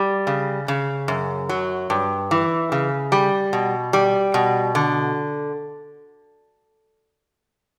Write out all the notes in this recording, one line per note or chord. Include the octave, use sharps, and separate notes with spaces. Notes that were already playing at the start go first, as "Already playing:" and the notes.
Already playing: G3
C#3
C#3
F#2
F#3
G2
E3
C#3
G3
B2
G3
B2
D3